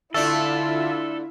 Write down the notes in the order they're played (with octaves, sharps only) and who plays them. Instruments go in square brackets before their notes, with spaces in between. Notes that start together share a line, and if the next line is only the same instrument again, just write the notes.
[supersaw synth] D3 F4 E5 [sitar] A3 D4 [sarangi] E4 [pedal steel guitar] A4